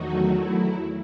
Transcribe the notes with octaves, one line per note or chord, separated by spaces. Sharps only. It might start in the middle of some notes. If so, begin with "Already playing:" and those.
Already playing: E2 D#3 F#3 A3 D#4 F#4
E4